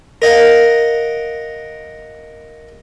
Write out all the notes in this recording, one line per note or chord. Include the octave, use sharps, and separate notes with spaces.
A#4 D#5 F5 F#5